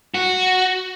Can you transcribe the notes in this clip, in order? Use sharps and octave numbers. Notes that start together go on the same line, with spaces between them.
F#4